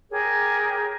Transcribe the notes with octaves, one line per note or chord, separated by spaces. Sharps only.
G4 G#4 A#4 C#5